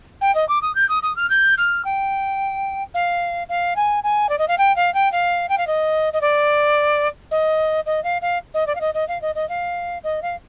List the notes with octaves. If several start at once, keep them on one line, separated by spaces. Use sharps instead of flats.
G5
D#5
D6
D#6
G6
D#6
D#6
F6
G6
F6
G5
F5
F5
G#5
G#5
D5
D#5
F5
G5
F5
G5
F5
G5
F5
D#5
D#5
D5
D#5
D#5
F5
F5
D#5
D5
F5
D#5
D#5
F5
D#5
D#5
F5
D#5
F5